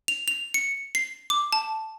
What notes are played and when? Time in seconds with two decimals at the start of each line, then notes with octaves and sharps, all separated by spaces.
0.08 F7
0.28 F7
0.54 C#7
0.95 C7
1.30 D6
1.53 A5